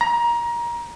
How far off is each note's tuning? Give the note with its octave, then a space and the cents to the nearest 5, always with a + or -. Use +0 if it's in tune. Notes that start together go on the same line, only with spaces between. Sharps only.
A#5 +20